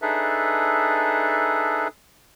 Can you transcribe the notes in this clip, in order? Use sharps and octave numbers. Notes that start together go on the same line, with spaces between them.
D4 D#4 G#4 A4 B4 E5